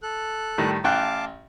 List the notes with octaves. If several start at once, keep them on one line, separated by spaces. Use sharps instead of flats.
A4 F#6
A2 D#3 G3
A1 F5 G5 A5 D6 F#6